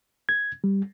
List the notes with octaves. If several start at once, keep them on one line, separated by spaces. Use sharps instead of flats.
G#6
G3